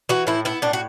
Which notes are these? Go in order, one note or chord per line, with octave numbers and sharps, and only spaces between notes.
E3 F#4
A2 E4
B3 E4
A2 D4
F#4